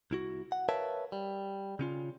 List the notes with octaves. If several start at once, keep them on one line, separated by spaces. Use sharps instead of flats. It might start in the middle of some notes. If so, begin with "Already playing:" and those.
C2 E4 F#4
F#5
A#4 B4 C#5 E5 F5 A5
G3
C#3 C#4 F4